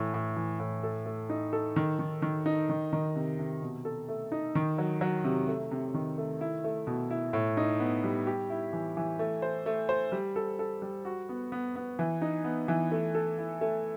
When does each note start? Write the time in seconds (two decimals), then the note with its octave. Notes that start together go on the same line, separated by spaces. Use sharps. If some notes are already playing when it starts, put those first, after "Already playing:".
Already playing: A2 E3
0.14 A2
0.36 E3
0.59 A2
0.83 A4
1.06 A3
1.30 D#4
1.53 A4
1.76 D#3
1.99 D#3
2.22 D#3
2.46 D#4
2.69 D#3
2.93 D#3
3.16 C3
3.39 C3
3.62 B2
3.85 A4
4.09 A3
4.32 D#4
4.55 D#3
4.78 F#3
5.01 F#3
5.24 C3
5.48 A3
5.71 C3
5.94 D#3
6.18 A3
6.41 E4
6.64 A3
6.87 B2
7.11 E4
7.33 A2
7.57 D#4
7.80 B3
8.04 G3
8.27 G4
8.50 E4
8.73 E3
8.97 E3
9.19 A3
9.42 C5
9.66 A3
9.89 C5
10.12 G3
10.36 A4
10.59 A4
10.82 G3
11.05 F#4
11.29 B3
11.52 B3
11.76 B3
11.99 E3
12.22 D#4
12.44 B3
12.68 E3
12.92 A3
13.15 A4
13.38 E4
13.61 A3